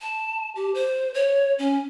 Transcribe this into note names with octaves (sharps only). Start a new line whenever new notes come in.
A5
G4
C5
C#5
C#4